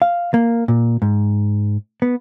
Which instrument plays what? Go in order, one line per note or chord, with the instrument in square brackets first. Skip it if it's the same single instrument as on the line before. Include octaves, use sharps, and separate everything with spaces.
[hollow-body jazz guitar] F5
A#3
A#2
G#2
B3